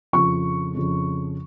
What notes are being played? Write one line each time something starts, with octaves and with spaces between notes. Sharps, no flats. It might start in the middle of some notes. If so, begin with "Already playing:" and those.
F2 C#3 F3 C#6
F2 C#3 F3